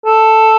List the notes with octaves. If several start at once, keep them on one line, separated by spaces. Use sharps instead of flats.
A4